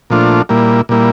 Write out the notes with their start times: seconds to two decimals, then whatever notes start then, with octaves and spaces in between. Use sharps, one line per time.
0.10 A#2 F3 A3 D4 F4
0.49 A#2 G3 A#3 E4
0.89 A#2 G3 A#3 E4